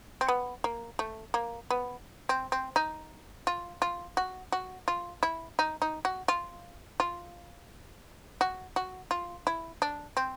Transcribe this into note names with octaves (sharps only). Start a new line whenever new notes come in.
C4
B3
A#3
A3
A#3
B3
C4
C4
D#4
F4
F4
F#4
F#4
F4
E4
D#4
D#4
F#4
F4
F4
F#4
F#4
F4
E4
D4
C4